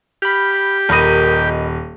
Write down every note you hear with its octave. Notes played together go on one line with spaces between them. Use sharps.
G4 B5 F6
D#1 A#4 D#5 B5 D#7